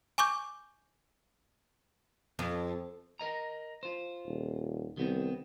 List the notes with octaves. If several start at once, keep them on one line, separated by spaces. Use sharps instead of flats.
G#5 C#6 D6 G6
F2
A#4 D#5 A#5
F4 C5
D#1
C2 D#3 B3 C4